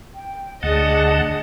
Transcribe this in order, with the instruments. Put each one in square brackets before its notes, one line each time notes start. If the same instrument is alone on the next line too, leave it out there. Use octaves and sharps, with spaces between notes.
[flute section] G5
[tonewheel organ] D2 F#5 A5 [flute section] D4 G#4 [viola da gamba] D#5